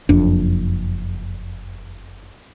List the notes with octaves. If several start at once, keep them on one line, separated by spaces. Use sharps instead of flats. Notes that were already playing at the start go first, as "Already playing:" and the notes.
F#1 F2 D4